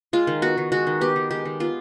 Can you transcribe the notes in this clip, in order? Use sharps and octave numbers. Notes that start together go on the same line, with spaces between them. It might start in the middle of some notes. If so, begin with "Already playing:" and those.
G#3 F4
D#3
B3 F#4
D#3
G#3 F#4
D#3
B3 G4
D#3
G#3 G4
D#3
B3 F4